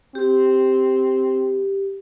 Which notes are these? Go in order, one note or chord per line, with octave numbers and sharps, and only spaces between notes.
C4 G4